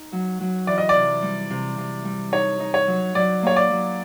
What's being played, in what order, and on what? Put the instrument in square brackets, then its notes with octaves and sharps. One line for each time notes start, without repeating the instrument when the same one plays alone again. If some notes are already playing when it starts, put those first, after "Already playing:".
Already playing: [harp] D#4
F#3
F#3
[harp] E3 [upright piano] D5
[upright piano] D#5
D5
[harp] C3
G3
C3
C3
G3
[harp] D#4 [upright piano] C#5
[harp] D#4
[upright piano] C#5
[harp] F#3
[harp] F#3 [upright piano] D5
[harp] A#3 [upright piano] C#5
[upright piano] D5
[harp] F#3